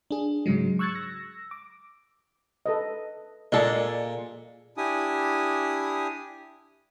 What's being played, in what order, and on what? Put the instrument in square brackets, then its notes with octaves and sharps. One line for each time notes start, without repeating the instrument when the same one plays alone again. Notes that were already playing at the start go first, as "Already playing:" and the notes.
[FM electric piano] D4 G#4
G#2 C#3 F#3 G#3
C#6 E6 F#6 G#6 A6 C#7
E6 A#6
D6
[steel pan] A4 B4 D#5
[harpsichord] A#2 [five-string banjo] G#3 D4 A4 [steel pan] D#5
[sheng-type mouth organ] D4 E4 G4 G#5 D#6